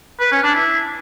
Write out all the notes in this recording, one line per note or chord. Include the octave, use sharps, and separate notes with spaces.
B4
C#4
D4
E4